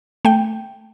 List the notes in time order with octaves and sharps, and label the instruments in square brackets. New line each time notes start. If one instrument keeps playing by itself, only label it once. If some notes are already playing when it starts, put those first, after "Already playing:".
[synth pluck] A3 G5